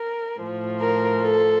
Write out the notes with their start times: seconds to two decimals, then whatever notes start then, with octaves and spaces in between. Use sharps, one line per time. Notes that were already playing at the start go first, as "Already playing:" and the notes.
Already playing: A#4
0.40 A2 F3
0.80 A#4
1.20 A4